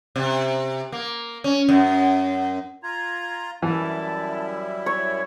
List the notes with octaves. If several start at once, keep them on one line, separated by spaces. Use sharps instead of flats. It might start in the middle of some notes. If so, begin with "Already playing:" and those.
C3
A#3
C#4
F#2
F4 A#5 G#6
F#2 E3 G3 E4 A5
C#5 G#6